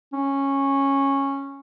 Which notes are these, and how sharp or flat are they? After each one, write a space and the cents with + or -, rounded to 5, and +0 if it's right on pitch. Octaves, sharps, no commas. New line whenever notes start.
C#4 -10